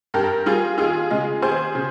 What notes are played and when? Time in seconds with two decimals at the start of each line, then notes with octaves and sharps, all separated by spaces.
0.14 G2 G4 A#4
0.46 G3 F4 G#4
0.78 D#2 F4 G#4
1.10 C#3 G#3
1.42 D#2 G#4 C5
1.75 C#3